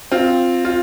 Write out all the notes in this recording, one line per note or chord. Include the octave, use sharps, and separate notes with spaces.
C4 F4
F4